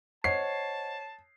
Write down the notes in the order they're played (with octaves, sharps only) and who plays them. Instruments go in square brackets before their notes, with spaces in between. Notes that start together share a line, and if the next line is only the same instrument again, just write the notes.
[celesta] C5 D#5 F#5 [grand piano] C#5 [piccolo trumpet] A5 [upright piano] C7